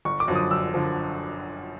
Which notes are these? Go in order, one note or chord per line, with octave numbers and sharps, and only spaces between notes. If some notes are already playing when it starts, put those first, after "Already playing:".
G1 C#6
D6
F#2 D3 F3
D#6
G1 E6
D3 F3